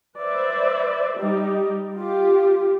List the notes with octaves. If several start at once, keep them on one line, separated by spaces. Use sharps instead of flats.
B4 C5 D5 E5
G3 D#4 G4
F4 G4